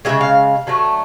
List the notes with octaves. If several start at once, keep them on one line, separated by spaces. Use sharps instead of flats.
C#3 E3 G#3 E5
F5
D3 F#3 A3